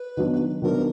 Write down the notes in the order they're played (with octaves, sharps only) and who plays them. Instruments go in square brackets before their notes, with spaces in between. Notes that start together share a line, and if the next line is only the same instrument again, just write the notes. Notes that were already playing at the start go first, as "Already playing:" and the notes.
Already playing: [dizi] B4
[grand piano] D#3 F#3 B3 D4
[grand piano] D#3 F#3 B3 D4 [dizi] A#4